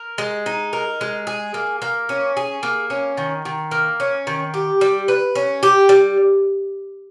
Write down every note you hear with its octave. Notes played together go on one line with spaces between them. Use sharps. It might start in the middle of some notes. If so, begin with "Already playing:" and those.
Already playing: A#4
G#3
D#4
A#4
G#3
G#4
A#3
A#3
C#4
G#4
A#3
C#4
D#3
D#3
A#3
C#4
D#3
G4
G3
B4
C#4
G4
G3